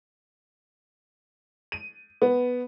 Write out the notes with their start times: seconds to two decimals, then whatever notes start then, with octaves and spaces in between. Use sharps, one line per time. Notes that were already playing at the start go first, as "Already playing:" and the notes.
1.72 D#7
2.22 B3